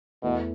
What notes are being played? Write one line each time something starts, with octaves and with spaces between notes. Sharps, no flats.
E2 B2 E3 A3